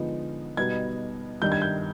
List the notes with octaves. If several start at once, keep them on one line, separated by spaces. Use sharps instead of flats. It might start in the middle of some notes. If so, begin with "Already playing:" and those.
Already playing: D3 F3 G#3 B3 D#4
B2 G3 B3 D#4 G#6
G2 D#3 G3 G6
G#6
G6